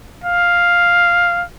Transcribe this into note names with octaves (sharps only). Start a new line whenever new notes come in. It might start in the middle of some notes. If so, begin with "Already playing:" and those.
F5